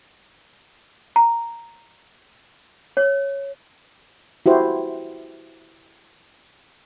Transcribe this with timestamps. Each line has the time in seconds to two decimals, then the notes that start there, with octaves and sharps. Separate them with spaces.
1.16 A#5
2.97 C#5
4.46 E4 F#4 G4 C5